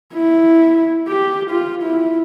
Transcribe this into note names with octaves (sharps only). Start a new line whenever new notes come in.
E4
G4
F4
E4